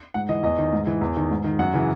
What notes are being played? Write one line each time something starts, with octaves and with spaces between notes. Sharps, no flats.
G#2 F#5
E3 D#5
E2 D#5
D#3
G#2
E3
E2
D#3
G#2
D#3
F#2 F#5
C#3 E3